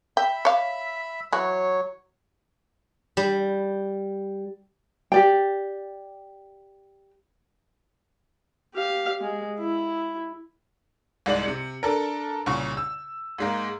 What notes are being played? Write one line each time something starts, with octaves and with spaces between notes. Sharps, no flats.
E5 G5 B5
C#5 F5
E3 F#3 F#4 C#5
G3
G4 D5 G5
G4 F5
G#3
E4
C2 G#2 G#3 D5 F#7
C3 C#7
D4 A4 A#4
C2 A#2 C#3 C#6
E6
G#2 G#3 A#3